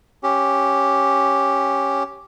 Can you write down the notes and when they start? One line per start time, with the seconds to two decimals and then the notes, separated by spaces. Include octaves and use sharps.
0.23 C#4 G4